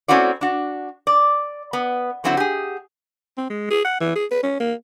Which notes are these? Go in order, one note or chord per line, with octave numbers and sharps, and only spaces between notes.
A3 C4 C#4 E4 F#4 D5
D4 F#4
D5
B3
D3 F#3 C4 E4 F#4
G4 G#4
C4
G#3
G#4
F#5
E3
G#4
B4
C#4
A#3